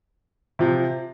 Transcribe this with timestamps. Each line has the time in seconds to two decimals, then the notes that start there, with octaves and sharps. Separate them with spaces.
0.59 C3 F3